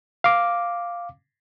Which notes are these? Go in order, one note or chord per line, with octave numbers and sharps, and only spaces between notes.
F5 D6